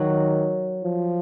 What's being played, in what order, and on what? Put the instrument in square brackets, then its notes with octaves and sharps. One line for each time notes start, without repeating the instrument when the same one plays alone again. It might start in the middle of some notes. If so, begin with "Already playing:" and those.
Already playing: [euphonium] D#3 [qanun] F#3 F#4
[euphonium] F3